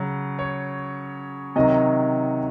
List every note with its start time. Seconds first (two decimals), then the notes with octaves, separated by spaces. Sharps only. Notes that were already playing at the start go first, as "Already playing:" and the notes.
Already playing: C#3 F#3
0.39 C#5
1.56 C3 D#3 F#3 D#5
1.69 C#5